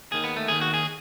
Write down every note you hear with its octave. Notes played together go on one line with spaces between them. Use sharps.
D#2 D#3 G#4
B3
A3
D#2 D#3 G#4
F#4
G#4